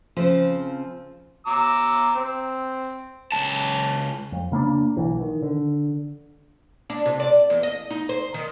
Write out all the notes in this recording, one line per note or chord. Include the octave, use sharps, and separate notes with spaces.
C#3 F3 C4 C5
A#5 D6 E6
C4
C#2 A5
F2
C#3 A#3 B3 D4
B1 E3
D#3
D3
D4
C3
D5
E2
D#5
D#4
C5
D#3